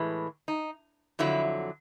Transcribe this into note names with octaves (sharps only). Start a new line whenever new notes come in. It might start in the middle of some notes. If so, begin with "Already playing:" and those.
Already playing: A2 E3 G#3
D#4
F2 D3 F#3 E4